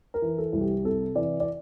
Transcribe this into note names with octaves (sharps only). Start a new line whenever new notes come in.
A#4
E3
A4
C2
G4
C3 A4
E3 D5
D5